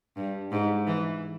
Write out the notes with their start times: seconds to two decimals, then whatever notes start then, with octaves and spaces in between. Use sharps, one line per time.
0.17 G2
0.52 G#2
0.87 E3